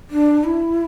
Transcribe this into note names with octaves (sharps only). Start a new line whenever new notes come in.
D4
E4